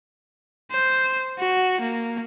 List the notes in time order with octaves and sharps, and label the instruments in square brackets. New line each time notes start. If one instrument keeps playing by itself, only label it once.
[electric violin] C5
F#4
A#3